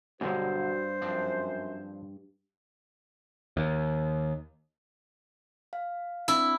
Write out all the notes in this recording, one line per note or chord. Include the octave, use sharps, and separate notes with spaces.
C#2 G2 B2 D3 F#3 F#4 C5
F#2 F3 C4 D4
D#2
F5
C4 D4 E4